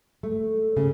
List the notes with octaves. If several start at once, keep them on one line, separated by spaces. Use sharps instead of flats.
A3
C#3